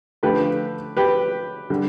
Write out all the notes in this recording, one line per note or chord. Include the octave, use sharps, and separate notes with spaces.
D3 F3 A3 G4 B4
G4 B4
D3 G3